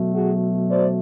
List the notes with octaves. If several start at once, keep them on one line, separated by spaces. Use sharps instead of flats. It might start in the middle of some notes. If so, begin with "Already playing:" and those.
Already playing: B2 F#3 A3
F#4 G#4
C5 D5